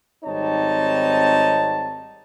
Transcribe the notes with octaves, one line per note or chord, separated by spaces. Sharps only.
G#1 G3 C4 D#4 C#5 A5